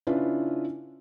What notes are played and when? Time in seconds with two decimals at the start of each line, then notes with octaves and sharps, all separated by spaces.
0.07 C#3 C#4 D4 E4 F4 B4